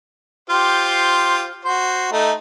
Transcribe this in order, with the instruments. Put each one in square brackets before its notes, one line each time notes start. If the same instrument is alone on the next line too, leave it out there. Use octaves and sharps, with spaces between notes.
[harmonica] F4 G4 C5
F#4 C5
A3 D#4